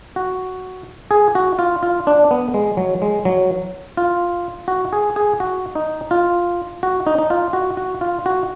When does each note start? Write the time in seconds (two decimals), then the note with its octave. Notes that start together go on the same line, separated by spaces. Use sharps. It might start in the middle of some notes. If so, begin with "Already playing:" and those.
0.16 F#4
1.11 G#4
1.35 F#4
1.59 F4
1.83 F4
2.07 D4
2.31 B3
2.54 G#3
2.77 F#3
3.02 G#3
3.25 F#3
3.97 F4
4.68 F#4
4.93 G#4
5.16 G#4
5.40 F#4
5.75 D#4
6.11 F4
6.83 F#4
7.07 D#4
7.18 D#4
7.30 F4
7.53 F#4
7.77 F#4
8.01 F4
8.26 F#4